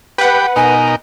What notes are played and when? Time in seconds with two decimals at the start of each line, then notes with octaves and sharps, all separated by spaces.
0.18 G4 B4 F#5 G5 B5
0.56 B2 D#4 A#4 G#5